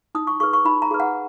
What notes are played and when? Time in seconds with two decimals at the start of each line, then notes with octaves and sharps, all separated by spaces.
0.15 D#4 D#6
0.27 C#6
0.40 G#4 B4 C#6
0.53 C#6
0.65 D#4 B5
0.82 A#5
0.91 G#4 B4
1.00 F#5